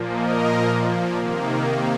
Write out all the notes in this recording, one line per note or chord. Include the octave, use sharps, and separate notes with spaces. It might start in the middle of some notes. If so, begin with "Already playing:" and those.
Already playing: A#2 F3 A#3
A#4 D#5
C3 D#3 A#3